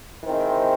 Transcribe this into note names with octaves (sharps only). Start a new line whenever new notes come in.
D#3 G#3 C4 E4